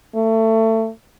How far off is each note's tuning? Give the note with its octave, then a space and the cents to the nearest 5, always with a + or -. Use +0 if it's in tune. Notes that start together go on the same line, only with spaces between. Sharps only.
A3 +25